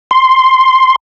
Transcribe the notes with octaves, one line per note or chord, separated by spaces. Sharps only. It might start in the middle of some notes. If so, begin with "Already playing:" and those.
C6